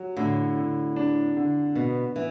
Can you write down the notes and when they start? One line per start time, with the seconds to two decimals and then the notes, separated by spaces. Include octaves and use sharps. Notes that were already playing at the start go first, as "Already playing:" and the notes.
Already playing: F#3
0.17 A2 D3
0.56 D3
0.96 D4
1.37 D3
1.75 B2 B3
2.16 E3